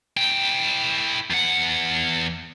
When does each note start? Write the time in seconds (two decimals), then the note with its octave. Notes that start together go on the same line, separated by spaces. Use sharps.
0.17 E4 G5
1.30 E2 F#5